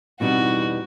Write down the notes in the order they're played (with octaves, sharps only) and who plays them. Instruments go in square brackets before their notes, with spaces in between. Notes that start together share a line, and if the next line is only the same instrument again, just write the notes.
[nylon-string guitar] E2 B2 G3 C4 D#4 [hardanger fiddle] F#4